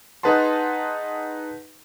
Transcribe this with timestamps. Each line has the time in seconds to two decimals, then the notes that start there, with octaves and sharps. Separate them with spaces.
0.23 D#4 G#4 B4 F#5 A5 C6